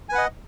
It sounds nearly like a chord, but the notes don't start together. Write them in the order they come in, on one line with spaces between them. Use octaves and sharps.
G#5 B4 F#5 D#5